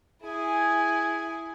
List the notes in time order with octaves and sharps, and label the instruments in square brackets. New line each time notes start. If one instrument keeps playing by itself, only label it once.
[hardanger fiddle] E4 G#5 [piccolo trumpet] G#4